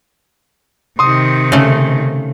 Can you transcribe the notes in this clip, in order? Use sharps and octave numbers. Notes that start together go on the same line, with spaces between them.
C3 D#3 C6 D#6
C#3 A3